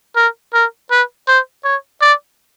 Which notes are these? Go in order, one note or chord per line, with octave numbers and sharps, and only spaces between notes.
A#4
A#4
B4
C5
C#5
D5